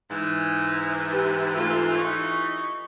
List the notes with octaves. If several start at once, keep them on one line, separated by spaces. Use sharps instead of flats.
G#2 E3
G4 B4
A3 F4
E3 D#4 C#6